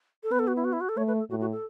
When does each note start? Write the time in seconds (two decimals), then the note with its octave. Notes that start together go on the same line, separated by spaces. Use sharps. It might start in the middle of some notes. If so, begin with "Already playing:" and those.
0.23 A4
0.31 B3 B4
0.39 A4
0.47 F#4
0.56 E4
0.64 F#4
0.73 E4
0.81 F#4
0.89 A4
0.97 A3 C#5
1.08 B4
1.19 A4
1.30 A2 F#4
1.41 F#4
1.52 A4